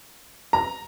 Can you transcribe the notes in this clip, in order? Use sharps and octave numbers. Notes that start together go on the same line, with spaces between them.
A#5